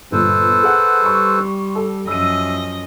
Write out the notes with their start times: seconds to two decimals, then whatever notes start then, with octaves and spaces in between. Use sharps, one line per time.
0.12 G1 A#2 A4 B4 C5
0.63 G#4 F#5 F#6
1.02 G3 C6 C#6
1.75 A4
2.07 F#2 F3 D#5 E5 E6 D#7